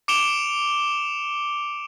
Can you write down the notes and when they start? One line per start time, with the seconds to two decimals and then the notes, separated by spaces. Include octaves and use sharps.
0.08 D6 C#7 D7 E7 F7 G7